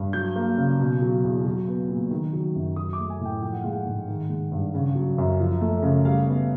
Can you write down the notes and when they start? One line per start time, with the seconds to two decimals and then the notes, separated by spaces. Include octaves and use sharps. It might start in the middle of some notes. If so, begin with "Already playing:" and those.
Already playing: G2
0.13 F#3 G6
0.36 A#3
0.57 C#3
0.79 B2
1.02 F#3
1.23 E2
1.45 F#3
1.67 B3
1.88 A#2
2.11 D#3
2.33 F#3
2.55 F#2
2.76 F#3 D#6
2.93 D6
2.99 A3
3.10 G#5
3.20 A2
3.25 G5
3.42 F3 G5
3.52 F#5
3.61 G#3 F5
3.72 F#5
3.86 G#2
4.08 D#3
4.30 G#3
4.52 G2
4.74 C#3
4.95 F#3
5.18 F#2
5.40 F3
5.61 A3
5.83 C#3
6.05 G3 F5
6.27 B3